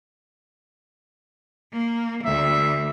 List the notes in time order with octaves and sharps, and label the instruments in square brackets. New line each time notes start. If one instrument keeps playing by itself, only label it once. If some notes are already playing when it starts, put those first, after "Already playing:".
[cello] A#3
[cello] D2 [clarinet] E5